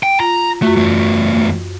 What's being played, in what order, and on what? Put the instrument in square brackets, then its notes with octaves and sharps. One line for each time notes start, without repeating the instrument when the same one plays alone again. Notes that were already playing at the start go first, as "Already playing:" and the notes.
[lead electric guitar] G5
[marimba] F4 [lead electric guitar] A#5
[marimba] F#2 F4 F#4 [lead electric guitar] A3
[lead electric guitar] E2 A3